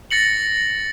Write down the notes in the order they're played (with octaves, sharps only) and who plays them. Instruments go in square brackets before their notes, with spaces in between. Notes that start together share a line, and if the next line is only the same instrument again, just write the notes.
[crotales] A6 A#6 C#7 F#7